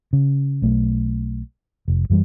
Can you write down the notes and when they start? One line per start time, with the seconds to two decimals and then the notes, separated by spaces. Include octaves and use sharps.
0.13 C#3
0.62 B1 A3
1.88 F1
2.10 F#2 E3 G3